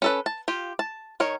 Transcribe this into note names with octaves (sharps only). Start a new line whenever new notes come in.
C#4 A4 B4
A5
F4 G4
A5
D#3 A#4 C#5